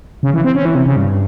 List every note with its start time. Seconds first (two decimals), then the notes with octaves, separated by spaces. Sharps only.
0.23 C#3
0.34 E3
0.44 C4
0.55 C#4
0.65 E3
0.75 C3
0.86 C#3
0.96 G2